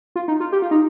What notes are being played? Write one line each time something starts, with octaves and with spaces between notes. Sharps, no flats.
F4
D#4
F4
G4
F4
D#4